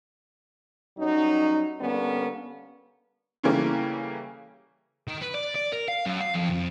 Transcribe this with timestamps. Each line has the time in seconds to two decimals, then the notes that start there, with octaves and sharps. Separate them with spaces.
0.98 F#2 F#3 G3 C#4 D#4
1.81 D3 G3 A#3 B3 C#4
3.44 C#3 E3 G3 A3 A#3 C#4
5.08 D#3
5.22 B4
5.35 D5
5.55 D5
5.73 A#4
5.88 F5
6.06 F#2
6.20 F5
6.34 F2
6.50 F2